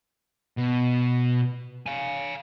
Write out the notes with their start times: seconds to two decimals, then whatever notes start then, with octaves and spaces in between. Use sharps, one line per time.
0.57 B2
1.86 F5 G#5